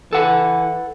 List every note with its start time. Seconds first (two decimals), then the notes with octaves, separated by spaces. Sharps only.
0.13 E3 A4 F#5